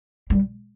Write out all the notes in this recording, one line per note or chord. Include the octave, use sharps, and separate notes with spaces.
G3